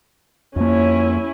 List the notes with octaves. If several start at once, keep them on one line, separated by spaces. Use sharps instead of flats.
F2 A#3 C#4 E4